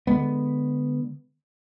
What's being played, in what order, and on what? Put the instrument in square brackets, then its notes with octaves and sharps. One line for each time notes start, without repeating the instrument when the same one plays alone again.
[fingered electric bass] D3 D#3 G#3 B3